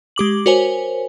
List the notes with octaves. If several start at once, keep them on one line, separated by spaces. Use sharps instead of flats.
G#3 G4 D6 F#7
F#4 A#4 C5 C#5 G#5